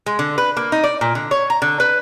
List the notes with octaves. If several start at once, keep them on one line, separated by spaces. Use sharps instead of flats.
G#3
D3
B4
A#3
D#4
D5
A#2
D3
C#5
A#5
D3
B4